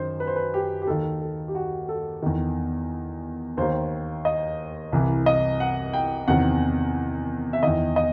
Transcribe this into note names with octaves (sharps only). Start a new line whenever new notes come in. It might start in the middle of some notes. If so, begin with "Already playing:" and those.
Already playing: F#2 D#3 C5
B4
C5
B4
G4
G4
D#2 D#3 A4
A4
G4
F#4
A4
E2 D#3
D#2 D#3 C5
D#5
C2 C3 E3
D#5
F#5
G5
E2 C3 D#3 F#5
E5
E2 D#3 D#5
D#5